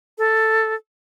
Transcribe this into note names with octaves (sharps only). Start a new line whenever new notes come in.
A4